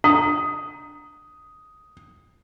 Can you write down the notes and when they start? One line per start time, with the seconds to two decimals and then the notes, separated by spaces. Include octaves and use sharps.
0.04 D4 D#6